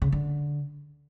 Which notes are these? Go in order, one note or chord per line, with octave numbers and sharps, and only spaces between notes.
C#3
D3